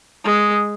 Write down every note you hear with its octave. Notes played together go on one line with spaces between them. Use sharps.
G#3